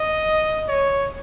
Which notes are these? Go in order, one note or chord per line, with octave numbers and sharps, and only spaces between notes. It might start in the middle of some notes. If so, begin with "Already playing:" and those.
Already playing: D#5
C#5